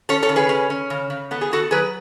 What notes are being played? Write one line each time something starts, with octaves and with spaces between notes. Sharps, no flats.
C#4 A4 C#5
A4 C#5
C#3
G#4 B4
C#4
C#4
C#3
C#3
B3 A4
G#4
B3 F#4 A4
F#3 G#4 B4